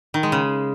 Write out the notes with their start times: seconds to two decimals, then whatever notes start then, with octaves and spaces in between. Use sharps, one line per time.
0.14 D#3
0.23 G#3
0.32 C#3